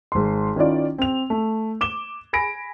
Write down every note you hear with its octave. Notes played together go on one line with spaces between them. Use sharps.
G#1 C6
D#3 C#4 E4 F4 D5
C4 F7
A3
D6 E7 G7
G#5 B5 A#6 D7